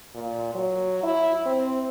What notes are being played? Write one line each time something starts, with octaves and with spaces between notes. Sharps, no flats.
A#2
F#3
E4
C4